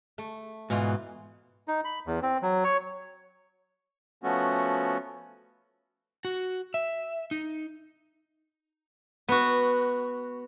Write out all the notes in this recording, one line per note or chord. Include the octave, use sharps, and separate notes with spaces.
A3
G#2 B2 E3 F4
D#4
B5
E2
C4
F#3
C#5
F3 A3 B3 C#4 F#4
F#4
E5
D#4
B3 F#4